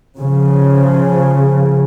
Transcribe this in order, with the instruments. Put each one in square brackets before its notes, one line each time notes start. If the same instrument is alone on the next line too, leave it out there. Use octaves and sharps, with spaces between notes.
[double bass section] C#3 F3